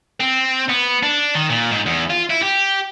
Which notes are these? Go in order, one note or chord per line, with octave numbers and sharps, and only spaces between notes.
C4
B3
D4
D#3
A#2
G#2
E2
F4
E4
G4